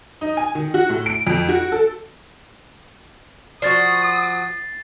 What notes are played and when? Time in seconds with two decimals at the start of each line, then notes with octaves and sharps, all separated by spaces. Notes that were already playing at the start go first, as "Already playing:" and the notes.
0.21 D#4
0.37 G#5
0.55 D#3
0.74 F#4
0.89 A2
1.06 D7
1.27 F2
1.49 F#4
1.72 A4
3.62 F3 F#4 D5 D#6 A6 C7